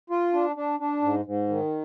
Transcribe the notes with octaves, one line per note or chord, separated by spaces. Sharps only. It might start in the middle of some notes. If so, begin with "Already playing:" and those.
F4
D4
D4
D4
G#2
G#2
D#3